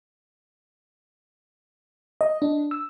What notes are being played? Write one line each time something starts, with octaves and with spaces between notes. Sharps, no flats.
D#5
D4
E6